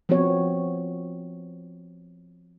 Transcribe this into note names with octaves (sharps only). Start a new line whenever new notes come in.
F3 B3 C4 F#4 C#5